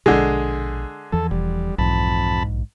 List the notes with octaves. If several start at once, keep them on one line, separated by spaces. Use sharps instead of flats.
A#1 B2 D3 G#3
E2 E3 F3 A4
E1 G3
B1 F2 G#2 E3 A5 B5
A#1 G#2